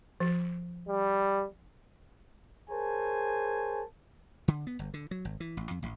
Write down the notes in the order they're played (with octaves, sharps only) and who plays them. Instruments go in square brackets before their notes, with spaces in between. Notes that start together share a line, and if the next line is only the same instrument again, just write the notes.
[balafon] F3
[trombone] G3
[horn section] G#4 A#4 C5 C#5 G#5 A5
[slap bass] D3
B3
G1
D3
F#3
G#1
E3
A1
F2
A1